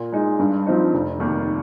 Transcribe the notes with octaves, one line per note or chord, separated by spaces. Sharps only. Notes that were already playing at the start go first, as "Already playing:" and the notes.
Already playing: A#2
G#3 D#4
G2
F3 C4 D#4
F1
D#2 D#3 A#3